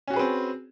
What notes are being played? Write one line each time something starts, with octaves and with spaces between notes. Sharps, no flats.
C4 C#4 F#4 G#4 B4